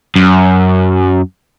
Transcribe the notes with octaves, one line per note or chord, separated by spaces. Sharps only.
F#2